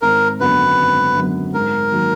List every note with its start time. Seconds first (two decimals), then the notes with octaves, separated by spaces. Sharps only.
0.02 G#1 A#4
0.40 F#2 D3 F#3 B3 B4
0.79 G#1
1.16 F#2 D3 F#3 B3
1.54 G#2 A#4
1.92 D#3 F#3 A#3